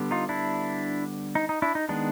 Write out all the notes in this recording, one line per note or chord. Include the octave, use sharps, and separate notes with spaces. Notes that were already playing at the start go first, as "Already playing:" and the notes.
Already playing: D3 G3 B3
D#4 F4
D4 E4
D#4
D#4
D4 E4
D#4
D#3 G#3 B3 D4